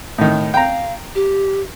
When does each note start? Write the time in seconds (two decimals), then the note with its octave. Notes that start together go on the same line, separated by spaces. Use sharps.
0.18 A2 D#3
0.54 F5 G5 A#5
1.15 G4